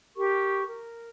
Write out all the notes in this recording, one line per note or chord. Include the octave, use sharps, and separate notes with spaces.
G4 A#4 C#6
A#4